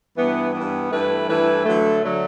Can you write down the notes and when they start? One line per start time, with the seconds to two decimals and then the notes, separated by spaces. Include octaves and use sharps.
0.16 G2 E3 B3
0.54 G2 E3 B3
0.91 G2 E3 A3 E4 B4
1.28 G2 E3 A3 E4 B4
1.65 D2 D3 F#3 A3
2.03 D3 F#3 A3